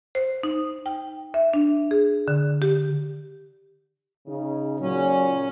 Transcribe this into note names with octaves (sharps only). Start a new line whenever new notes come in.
C5
D#4
G5
E5
D4
G#4
D3
G4
C#3 D#4
A#2 C#3 F#3 C#4